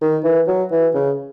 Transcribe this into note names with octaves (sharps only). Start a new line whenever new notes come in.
D#3
E3
F#3
E3
C#3